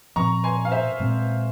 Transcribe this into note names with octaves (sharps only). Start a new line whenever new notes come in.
A#2 F3 C4 A#5 C#6
G#5 C6
F5
C5 E5
A#2 G#3 C4